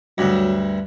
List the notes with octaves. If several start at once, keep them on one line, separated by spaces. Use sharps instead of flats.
D2 G2 F#3